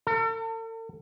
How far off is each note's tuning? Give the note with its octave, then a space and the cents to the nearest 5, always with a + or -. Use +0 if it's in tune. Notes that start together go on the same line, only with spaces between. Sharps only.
A4 +45